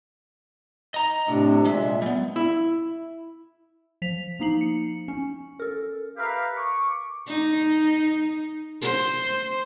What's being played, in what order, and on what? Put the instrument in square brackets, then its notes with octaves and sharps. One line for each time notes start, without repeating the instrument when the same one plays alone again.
[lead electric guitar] D#5 A#5
[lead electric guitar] A2 [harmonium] C3 D4
[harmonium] A#2 E5 [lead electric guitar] G#3
[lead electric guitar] G3 B3
[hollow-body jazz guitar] E4
[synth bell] F3 B6 F7
F3 A#3 D#4 C7 F#7
C#7
C#4
A4 A#4
[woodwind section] G4 A#4 B4 E5 F5
C#6 D6
[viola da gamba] D#4
C5